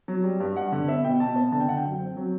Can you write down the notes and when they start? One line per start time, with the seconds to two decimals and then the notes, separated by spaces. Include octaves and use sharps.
0.08 F#3
0.24 G3
0.40 G2
0.56 G2 F#5
0.72 D3
0.88 B3 E5
1.04 B2 G5
1.20 B2 A5
1.36 B3
1.52 D3 A5
1.60 G5
1.68 D3 F#5
1.77 G5
1.84 F#2
2.00 C4
2.17 F#3